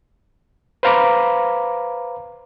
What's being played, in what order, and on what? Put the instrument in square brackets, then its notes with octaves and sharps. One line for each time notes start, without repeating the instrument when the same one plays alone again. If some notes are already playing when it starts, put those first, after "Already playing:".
[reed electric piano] B4 C5 F5 A#5 B5 D6